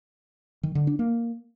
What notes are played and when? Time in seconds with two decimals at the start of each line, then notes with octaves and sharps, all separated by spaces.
0.63 D#3
0.75 D3
0.87 D4
0.99 A#3